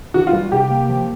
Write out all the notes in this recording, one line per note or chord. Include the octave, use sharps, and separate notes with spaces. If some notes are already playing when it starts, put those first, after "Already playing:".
E3 F#4
F4
G3
C3 G4
A#3
F3